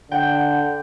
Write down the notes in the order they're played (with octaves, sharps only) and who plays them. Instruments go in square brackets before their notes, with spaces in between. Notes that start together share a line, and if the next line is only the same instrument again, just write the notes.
[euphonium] D3 [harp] F#5 G5